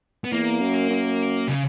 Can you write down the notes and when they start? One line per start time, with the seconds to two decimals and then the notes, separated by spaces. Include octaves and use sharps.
0.25 B3
0.32 E2 A#3
0.61 F#2
0.90 F#2
1.48 C#3